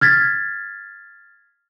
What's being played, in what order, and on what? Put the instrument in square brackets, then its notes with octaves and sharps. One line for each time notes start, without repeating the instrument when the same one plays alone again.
[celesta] F6 G#6 A6 B6